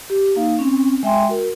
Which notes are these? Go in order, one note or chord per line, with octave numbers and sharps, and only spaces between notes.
G4
A#3 D#4 F5
C4 C#4
G#3 E5 G5 G#5 C6
F#4 A#4